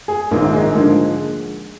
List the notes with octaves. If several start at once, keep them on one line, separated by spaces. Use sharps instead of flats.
G#4
A#1 G#2 D#3 A#3
G#3
D3 F3 G#3 A#3